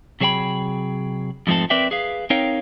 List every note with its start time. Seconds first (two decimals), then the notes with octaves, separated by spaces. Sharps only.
0.20 C3 F#3 G#4 C5 G5 B5
1.47 F2 G#2 F3 A3 C4 A4
1.70 C4 A#4 B4 D5 E5 G5
1.91 G#4 B4 F5
2.30 C4 D#4 A#4 C#5 F5 G5